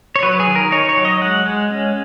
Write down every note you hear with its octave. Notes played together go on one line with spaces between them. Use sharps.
C#5
F#3 B4
G#4
D#3
A#4
D#4 C#5
C#5
F#3
D#5
G#3 F#5
G#3
C#4